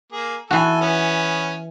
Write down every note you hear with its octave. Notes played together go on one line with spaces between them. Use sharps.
A#3 G#4
E3 F#4 A4 G#5
B3 C#4